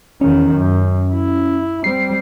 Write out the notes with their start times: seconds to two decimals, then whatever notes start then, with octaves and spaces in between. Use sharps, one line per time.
0.21 E2 D#3 C#4
0.56 F#2
1.13 E4
1.84 G3 C4 C7